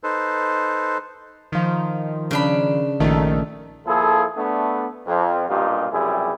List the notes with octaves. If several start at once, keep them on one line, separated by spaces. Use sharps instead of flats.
D#4 A4 B4 C5
D#3 F3
C#3 D4 B5
A#1 D#3 A3
F3 A#3 E4 G#4 A4
A3 B3 D4
F2
B1 G2 A#2 D#4 F4 G4
C#2 F#2 C3 G3 E4 G#4